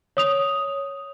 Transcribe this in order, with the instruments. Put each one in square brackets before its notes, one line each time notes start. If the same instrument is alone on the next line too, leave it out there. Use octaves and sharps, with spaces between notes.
[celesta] C#5 D#6 F7